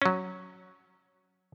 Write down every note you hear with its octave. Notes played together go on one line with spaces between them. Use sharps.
F#3 C#4